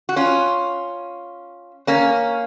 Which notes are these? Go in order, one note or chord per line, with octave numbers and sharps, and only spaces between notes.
F#4
C#4 F4
A#3 C#4